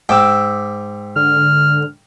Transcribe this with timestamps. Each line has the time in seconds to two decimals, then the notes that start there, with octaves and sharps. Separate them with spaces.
0.09 G#2 G5 D6 E6
1.16 D3 F6